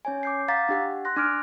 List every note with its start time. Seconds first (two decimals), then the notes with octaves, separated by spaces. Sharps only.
0.05 C#4 C#5 G#5
0.23 D6 G6 C7
0.48 F5 F#5 A#5 D6 A6 B6
0.69 D4 G4 F#5
1.05 C6 F#6 A#6
1.16 D4 D6 F6 D7